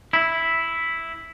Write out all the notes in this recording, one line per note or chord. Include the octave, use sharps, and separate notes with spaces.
E4